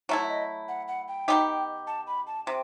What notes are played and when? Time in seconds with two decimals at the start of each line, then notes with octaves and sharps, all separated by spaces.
0.09 F#3 A3 E4 E5
0.29 D#5
0.68 F#5
0.88 F#5
1.08 G5
1.28 B2 G3 D#4 G4
1.87 A5
2.07 B5
2.27 A5
2.46 C3 G5